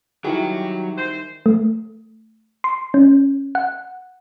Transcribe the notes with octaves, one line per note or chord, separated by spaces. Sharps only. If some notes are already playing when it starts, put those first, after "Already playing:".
D#3 F#3 G3 E4 F#4 G#4 D6
C5
A3
C6
C#4
F#5